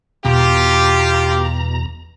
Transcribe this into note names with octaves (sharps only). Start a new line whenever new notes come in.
E2 B2 F4 G4 A#5